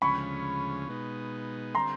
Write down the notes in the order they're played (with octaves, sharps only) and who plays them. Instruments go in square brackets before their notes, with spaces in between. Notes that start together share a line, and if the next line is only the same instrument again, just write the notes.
[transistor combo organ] D2 C#3 F3 G#3 C#4 [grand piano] B5 C#6
[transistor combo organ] B2 G#3 B3 D#4
[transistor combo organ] D3 G3 C4 [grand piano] A#5 C6